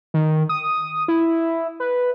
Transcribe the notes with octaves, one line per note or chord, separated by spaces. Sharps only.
D#3
D#6
E4
B4